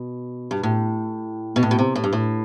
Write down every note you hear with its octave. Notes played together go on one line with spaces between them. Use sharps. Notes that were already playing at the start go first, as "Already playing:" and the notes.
Already playing: B2
G2
A2
B2
A2
B2
C3
A2
G2
A2